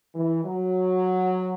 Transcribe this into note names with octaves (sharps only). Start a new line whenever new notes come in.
E3
F#3